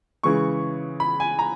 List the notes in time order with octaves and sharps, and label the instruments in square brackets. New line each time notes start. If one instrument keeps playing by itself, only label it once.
[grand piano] C#3 E3 G#3 C#6
B5
G#5
A#5